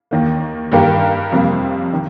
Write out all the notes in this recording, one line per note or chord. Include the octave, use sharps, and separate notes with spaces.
D#2 D#3 A#3
G2 D#3 A#3 G4 A#4
F2 C3 G3 A#3
D#3